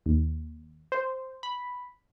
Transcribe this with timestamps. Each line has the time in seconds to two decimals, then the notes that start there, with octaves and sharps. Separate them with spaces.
0.06 D#2
0.92 C5
1.43 B5